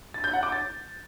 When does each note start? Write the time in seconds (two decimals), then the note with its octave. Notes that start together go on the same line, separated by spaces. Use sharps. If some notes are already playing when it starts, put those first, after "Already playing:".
0.14 A6
0.24 G6
0.33 F#5
0.43 D6
0.52 A6